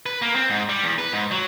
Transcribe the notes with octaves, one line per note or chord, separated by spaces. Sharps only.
B4
A#3
C4
G#2
G3
E2
B4
G#2
F#3